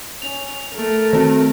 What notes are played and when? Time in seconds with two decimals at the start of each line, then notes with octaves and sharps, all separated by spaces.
0.22 C#4 F7
0.75 A3 A#4
1.13 D#3 C4